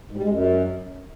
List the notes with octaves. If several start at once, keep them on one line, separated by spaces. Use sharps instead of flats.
G#2
G3
G#3
F#2